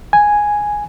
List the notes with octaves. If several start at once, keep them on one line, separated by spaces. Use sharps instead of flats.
G#5